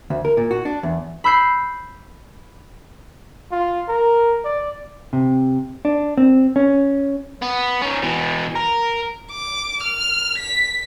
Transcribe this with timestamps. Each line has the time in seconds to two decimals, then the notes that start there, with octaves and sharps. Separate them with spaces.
0.10 D2
0.25 A#4
0.37 A#2
0.51 F#4
0.65 D4
0.83 E2
1.24 B5 E6 G6 C7
3.51 F4
3.88 A#4
4.45 D5
5.13 C3
5.85 D4
6.18 C4
6.56 C#4
7.42 B3
7.82 C#4 D#4
8.03 B2 E3
8.55 A#4
9.32 D6
9.83 F6
10.39 B6